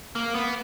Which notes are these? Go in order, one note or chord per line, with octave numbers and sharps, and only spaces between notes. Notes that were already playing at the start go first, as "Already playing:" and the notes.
A#3
B3